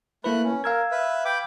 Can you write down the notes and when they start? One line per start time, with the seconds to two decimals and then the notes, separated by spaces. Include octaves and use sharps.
0.24 A3 A#3 E4 B4 B5 F#6
0.44 C#4
0.64 A#4 F5 E6 G#6
0.91 B4 E5
1.25 G5 B5 D6